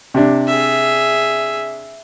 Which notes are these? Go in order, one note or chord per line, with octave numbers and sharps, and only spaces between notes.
C3 D4
G#4 E5